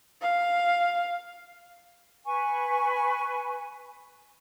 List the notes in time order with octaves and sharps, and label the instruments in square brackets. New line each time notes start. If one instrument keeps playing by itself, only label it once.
[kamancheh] F5
[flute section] B4 G#5 C#6